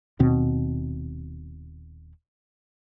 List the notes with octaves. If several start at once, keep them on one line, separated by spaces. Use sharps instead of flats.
D#1 D#2 B2 C4